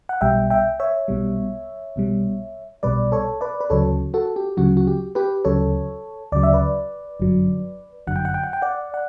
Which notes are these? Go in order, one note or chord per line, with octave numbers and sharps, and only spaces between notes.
F#5
B1 B2 G3 E5 G5
E5 G5
C#5 E5
B1 B2 G3
B1 B2 G3
B1 B2 G3 B4 D5
A4 C#5
B4 D5
B4
D2 C#3 F#3 A4 C#5
F#4 A4
G4
D2 C#3 F#3 F#4
F#4
G4
G4 B4
D2 C#3 F#3 A4 C#5
D2 C#3 F#3 D5
E5
B4 D5
G1 F#2 D3 F#3
G1 F#2 D3 F#3 F#5
G5
F#5
G5
F#5
G5
D5 F#5
F#5